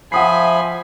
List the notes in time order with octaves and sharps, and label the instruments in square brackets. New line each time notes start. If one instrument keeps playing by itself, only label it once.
[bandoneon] F3 B5 [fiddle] E5 G#5 [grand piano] F#5 D#6 C7